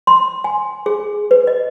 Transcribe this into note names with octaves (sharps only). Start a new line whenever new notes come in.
C6
G#5
G#4
B4
D#5